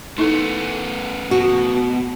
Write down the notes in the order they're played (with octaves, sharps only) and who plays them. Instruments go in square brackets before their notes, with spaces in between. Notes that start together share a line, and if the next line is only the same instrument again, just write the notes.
[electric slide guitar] A3 B3 [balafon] D#4 E4 A4
[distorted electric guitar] B2 [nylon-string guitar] F#4